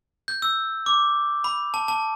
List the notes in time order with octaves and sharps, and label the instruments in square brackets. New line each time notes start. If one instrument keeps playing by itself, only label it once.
[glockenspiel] G6
E6
D6
B5
A5
A5